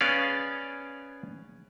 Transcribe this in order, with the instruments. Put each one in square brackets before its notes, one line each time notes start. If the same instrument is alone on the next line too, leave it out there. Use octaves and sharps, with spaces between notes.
[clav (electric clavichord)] B3 C#4 G#4 D5 F5 F#5